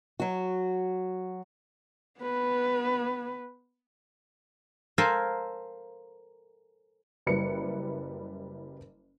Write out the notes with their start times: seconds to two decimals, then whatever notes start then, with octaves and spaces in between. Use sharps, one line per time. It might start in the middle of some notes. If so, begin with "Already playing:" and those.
0.20 F#3 F#4
2.21 B3 B4
4.98 A4 A#4 C5 F5 G#5 A5
7.26 F#1 G3 E4 B4 C#7